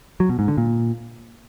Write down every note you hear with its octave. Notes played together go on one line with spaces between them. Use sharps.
F#3
B2
G#2
D3
A#2